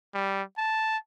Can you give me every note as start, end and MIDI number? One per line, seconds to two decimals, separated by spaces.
0.14 0.42 55
0.58 0.98 81